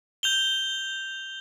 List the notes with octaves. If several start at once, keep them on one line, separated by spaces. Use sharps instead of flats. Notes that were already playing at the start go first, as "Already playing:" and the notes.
G6 F7 G7